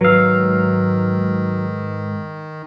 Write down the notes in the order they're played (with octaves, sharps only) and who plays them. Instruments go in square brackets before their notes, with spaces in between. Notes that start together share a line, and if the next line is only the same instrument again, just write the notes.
[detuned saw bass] G#2 [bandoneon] D#3 [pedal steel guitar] F#3 F5 [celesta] B4 E6